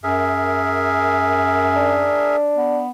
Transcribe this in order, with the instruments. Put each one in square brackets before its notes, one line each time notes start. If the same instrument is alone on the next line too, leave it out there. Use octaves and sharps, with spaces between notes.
[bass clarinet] F#2 [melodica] G#4 A#4 E5
[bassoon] D4
[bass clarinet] B3